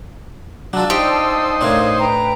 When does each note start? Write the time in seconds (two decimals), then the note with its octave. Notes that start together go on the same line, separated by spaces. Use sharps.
0.73 F#3 D4 F4 D5 A5 E6
0.90 D#4 G4 C5
1.61 A2 C4 D4 A#4 C#5 F5
1.98 B4 G5 A#5